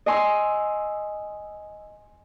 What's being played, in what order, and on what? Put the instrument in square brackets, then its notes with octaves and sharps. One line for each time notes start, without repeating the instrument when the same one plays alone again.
[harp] D#5 G#5 C6 E6